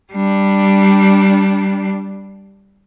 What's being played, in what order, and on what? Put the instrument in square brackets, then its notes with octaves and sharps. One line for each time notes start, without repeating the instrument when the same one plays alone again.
[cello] G3 D4